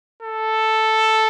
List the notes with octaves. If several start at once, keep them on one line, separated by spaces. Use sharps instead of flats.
A4